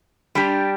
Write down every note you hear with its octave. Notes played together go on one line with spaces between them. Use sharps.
G3 D4 G4